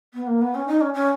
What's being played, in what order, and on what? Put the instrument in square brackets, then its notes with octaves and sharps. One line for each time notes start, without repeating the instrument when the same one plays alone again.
[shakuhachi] B3
A#3
B3
C#4
D#4
C#4
C#4